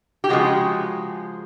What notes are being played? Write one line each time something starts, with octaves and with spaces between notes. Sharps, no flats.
G4
C#3 F3 G#3 F#4